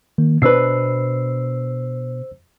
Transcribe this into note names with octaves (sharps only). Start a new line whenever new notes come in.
D#3 A#3
B2 D4 B4 C5 E6 C7